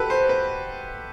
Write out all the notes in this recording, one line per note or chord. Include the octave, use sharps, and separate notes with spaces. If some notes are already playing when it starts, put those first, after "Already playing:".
Already playing: F#4 G4 A4 B4
C5
B4